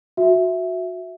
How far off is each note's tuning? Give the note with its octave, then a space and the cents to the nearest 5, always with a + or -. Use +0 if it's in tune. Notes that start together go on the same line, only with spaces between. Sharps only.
F#4 -15 E5 +0